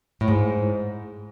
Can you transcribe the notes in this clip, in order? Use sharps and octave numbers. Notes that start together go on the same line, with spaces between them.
A2
G#2